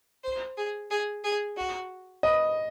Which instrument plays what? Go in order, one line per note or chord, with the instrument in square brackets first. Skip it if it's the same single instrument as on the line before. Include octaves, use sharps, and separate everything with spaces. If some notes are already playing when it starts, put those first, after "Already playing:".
[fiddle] C5
G#4
G#4
G#4
F#4
[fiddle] B4 [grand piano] D#5